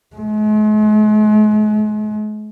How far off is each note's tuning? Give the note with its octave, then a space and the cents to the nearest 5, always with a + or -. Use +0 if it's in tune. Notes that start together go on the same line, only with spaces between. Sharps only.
G#3 +45